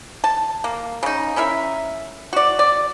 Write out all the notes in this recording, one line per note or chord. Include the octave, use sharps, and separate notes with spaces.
A5
A#3
C#3 D#4
C#4 E4 A#4 E5
F#4 D5
D5